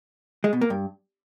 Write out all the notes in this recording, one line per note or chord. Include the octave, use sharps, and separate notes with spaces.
G#3
B2
A#3
G2